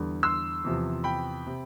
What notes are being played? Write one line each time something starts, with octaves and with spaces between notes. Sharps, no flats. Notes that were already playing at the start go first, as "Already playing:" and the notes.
Already playing: E2 D3 G3
C6 E6
E2 C3 F3
G5 B5
C3